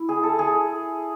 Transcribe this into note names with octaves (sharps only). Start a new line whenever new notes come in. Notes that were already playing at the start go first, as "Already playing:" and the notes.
Already playing: E4
G#4
A4
G#4